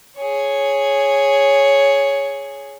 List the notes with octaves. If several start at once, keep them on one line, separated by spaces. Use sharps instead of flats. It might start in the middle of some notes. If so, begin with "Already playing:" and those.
G#4 C#5